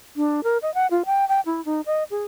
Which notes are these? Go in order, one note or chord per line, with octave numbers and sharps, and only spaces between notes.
D4
A#4
D#5
F#5
F4
G5
G5
E4
D#4
D#5
G#4